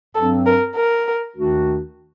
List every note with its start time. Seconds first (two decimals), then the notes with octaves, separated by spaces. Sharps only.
0.15 G2 F#3 C4 A4
0.46 A#4
0.76 A#4
1.35 D#2 D#3 A3 D4 F#4